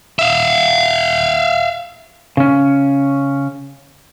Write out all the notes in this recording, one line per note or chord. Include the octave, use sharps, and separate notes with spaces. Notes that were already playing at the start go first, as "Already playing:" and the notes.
E5 F5
C#3 C#4